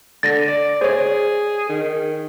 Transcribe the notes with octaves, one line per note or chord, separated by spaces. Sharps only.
D3 A6 A#6
D5
G#4 C5 C#5
D#3